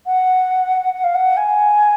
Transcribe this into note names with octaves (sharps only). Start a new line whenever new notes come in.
F#5
F#5
F5
F#5
G#5